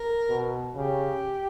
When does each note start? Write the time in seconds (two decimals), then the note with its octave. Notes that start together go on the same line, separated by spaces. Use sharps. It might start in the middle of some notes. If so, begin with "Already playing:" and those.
Already playing: A#4
0.29 B2
0.74 C#3 G4